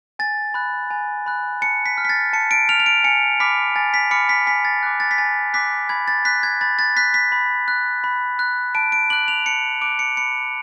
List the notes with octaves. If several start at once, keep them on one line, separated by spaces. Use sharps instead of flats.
G#5 A6
B5 F#6
G#5
B5 F#6
A5 C#7
B6
F6
B6
A6
A5 C#7
D7
F6 F7
F7
D7
G#5 C#7
B5 D6 F6 B6
G#5 A6
B6
B5 D6 F6 C#7
B6
G#5 B6
A6
D6 F#6
A6
B6
G#5 A6
D6 F#6 B6
B5 G#6
A6
F#6 B6
G#6
B5 A6
A6
F#6 B6
B6
B5
F#6
B5
F#6
A5 D7
D7
D6 F#6 F#7
F7
A5 C#7
D6 F#6 D7
C#7
B5 C#7